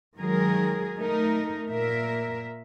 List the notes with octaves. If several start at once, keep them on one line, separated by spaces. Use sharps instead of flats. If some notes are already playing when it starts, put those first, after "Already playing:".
D#3 F#3 G#3 G#4 A#4
A3 D#4 A#4
A#2 A#3 A#4 E5